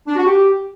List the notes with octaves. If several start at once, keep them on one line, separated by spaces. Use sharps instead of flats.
D4
F#4
G4